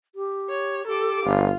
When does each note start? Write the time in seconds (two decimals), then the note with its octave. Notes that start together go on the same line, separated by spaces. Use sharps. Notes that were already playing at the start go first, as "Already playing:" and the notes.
0.15 G4
0.49 C#5
0.88 G4 A4 D6
1.25 G1 F4